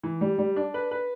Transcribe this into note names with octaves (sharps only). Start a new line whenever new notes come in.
E3
G3
G3
D4
B4
B4